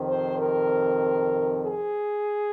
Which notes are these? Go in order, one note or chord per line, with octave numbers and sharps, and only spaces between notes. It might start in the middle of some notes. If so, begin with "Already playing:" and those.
Already playing: F2 C3 D#3 C4
C5
A#4
G#4